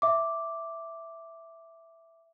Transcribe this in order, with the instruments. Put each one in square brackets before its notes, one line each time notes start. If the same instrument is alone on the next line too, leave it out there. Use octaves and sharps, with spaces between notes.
[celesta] E5 D6